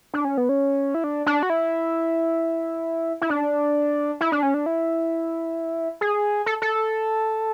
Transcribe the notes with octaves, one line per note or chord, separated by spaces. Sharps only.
D4
C#4
B3
C#4
E4
D4
D4
F#4
E4
E4
D4
E4
D4
C#4
D4
E4
G#4
A4
A4